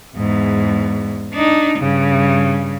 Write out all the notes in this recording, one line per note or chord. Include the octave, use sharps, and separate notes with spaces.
E2 G#2
D4 D#4
G2 C#3